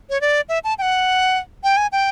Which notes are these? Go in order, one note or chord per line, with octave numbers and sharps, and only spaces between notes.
C#5
D5
E5
A5
G5
F#5
G5
G#5
G5